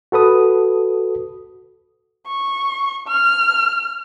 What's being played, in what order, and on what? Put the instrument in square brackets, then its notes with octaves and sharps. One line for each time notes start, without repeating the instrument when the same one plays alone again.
[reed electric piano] F#4 A4 B4 D#6
[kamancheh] C#6
F6